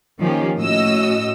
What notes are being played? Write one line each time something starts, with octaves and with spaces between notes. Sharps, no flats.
D#3 F3 A#3 C#4 G4
A2 C#4 F#4 D#5 E6